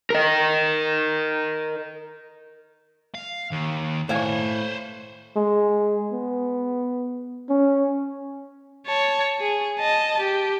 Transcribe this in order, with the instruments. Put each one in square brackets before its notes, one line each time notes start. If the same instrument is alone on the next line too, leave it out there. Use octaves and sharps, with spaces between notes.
[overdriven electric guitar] A#4 D#5
[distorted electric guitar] F5
D#2
[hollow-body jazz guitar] A2 F5 G#5 [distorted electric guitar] C5 C#5
[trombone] G#3
B3
C#4
[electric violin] C#5 A5
G#4
D#5 A5
G4